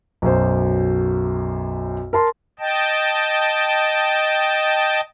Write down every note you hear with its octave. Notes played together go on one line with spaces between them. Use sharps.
B1 F#2 C5
A#4 A5 C6
D#5 G5 A5